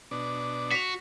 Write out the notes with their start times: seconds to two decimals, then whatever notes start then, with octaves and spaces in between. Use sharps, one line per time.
0.11 B2 D4
0.71 F#4 B6 F7